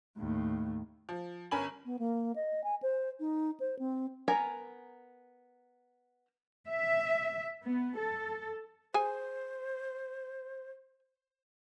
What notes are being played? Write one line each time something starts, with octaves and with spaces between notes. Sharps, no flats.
D#2 A2
F3
G1 C#4 A#4 G#5 B5 F#7
B3
A#3
D#5
G#5
C5
D#4
C5
C4
B3 A#4 F#5 G#5 A#5
E5
B3
A4
G#4 C5 G#5